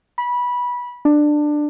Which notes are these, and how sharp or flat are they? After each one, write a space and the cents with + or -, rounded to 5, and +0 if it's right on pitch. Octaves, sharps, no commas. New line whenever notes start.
B5 -20
D4 +15